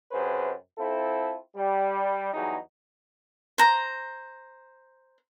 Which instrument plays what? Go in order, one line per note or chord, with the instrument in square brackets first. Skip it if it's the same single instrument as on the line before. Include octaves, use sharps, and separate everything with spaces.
[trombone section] F#2 C3 G#4 B4 C5
C4 E4 F4 A4
G3
E2 F#3 G3 D#4 G#4
[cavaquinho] C5 A#5